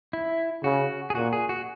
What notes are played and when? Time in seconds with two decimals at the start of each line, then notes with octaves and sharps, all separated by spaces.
0.13 E4
0.64 C#3 F#4
1.10 G#4
1.15 A#2 F#4
1.33 G#4
1.49 F#4